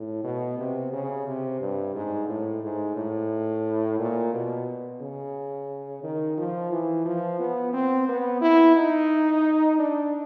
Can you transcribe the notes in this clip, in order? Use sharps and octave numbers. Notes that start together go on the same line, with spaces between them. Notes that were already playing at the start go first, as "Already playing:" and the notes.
Already playing: A2
B2
C3
C#3
C3
G2
G#2
A2
G#2
A2
A#2
B2
C#3
D#3
F3
E3
F3
B3
C4
B3
E4
D#4
D4